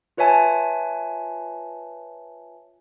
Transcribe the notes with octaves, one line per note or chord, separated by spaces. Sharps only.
F4 B4 C#5 E5 G#5 A5